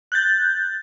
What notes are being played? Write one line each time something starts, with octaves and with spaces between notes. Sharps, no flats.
F#6 G6 A6